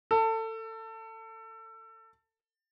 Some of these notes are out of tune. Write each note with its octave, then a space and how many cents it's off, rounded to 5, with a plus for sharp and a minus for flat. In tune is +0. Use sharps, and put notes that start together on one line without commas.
A4 +25